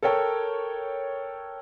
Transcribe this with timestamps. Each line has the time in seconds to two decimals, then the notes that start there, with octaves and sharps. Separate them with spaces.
0.02 A4 A#4 C#5 G5